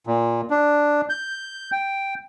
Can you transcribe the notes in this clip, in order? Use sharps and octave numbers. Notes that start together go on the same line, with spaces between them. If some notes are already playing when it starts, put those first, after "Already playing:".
A#2
D4
G6
G5